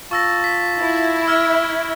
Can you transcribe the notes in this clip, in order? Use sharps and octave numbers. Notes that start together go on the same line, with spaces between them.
F4 A5 C#6 E6 A#6
B6
E4
E5 E6 F6 G#6